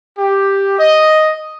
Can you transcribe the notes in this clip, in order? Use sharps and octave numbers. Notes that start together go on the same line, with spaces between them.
G4
D#5